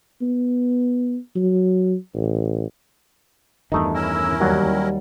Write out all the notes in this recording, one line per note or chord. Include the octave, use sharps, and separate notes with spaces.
B3
F#3
A1
E2 G2 D#3 A3 D#4
C#4 E4 A#4 E6
D#2 F#3 G3